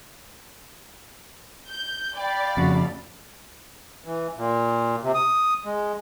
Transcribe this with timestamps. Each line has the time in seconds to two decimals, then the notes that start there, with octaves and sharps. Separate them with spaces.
1.67 G6
2.16 D5 F5 G5 B5
2.57 F2 C#3 F#4
4.05 E3
4.37 A#2
5.02 C3
5.15 D#6
5.65 G#3